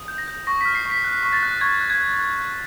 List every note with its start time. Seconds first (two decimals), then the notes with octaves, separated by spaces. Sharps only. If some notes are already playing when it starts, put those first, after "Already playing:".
Already playing: D#6
0.08 G6
0.18 A#6
0.27 G6
0.47 C#6 A#6
0.61 F6 B6
0.75 C7
0.85 C#6 B6
1.04 F#6
1.23 C#6
1.33 A6
1.43 F#6
1.61 C#6 G#6
1.81 F#6
1.90 G#6
2.00 F#6
2.20 F#6
2.38 F#6